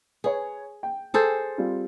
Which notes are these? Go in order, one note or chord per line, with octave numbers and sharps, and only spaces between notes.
G#4 B4 C#5
G5
G#4 A4 C5
G3 C4 F4